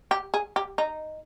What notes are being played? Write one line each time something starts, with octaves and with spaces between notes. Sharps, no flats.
G4
G#4
G4
D#4